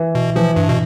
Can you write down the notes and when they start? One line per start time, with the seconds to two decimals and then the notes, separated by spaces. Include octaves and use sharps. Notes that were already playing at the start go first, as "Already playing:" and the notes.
Already playing: E3
0.15 B2
0.36 E3 F3
0.56 G2
0.69 B2